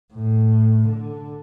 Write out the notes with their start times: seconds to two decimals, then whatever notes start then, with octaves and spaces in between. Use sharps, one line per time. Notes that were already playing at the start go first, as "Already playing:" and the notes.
0.14 A2
0.89 D3